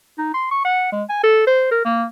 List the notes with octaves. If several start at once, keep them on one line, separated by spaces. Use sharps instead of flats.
D#4
C6
C#6
F#5
G#3
G#5
A4
C5
A#4
A#3